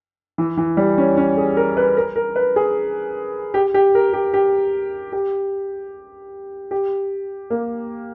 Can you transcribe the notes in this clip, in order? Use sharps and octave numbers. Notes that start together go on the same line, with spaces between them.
E3
E3
G3
C#4
C#4
G#4
A#4
B4
A#4
A#4
B4
G#4
G4
G4
A#4
G4
G4
G4
G4
A#3